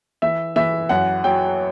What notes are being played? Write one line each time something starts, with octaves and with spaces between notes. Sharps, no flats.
E3 E5
E3 E5
F#2 F#5
F#3 G5